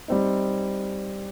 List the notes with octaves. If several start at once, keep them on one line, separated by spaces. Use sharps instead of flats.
G3 C4 D#4